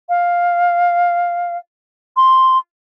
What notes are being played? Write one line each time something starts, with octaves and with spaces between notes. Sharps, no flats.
F5
C6